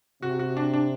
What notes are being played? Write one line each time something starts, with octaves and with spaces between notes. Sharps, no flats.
C3 F#4
F#4
D4
D4